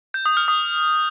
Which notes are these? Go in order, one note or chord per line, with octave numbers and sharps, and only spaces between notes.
G6
D#6
F6
D#6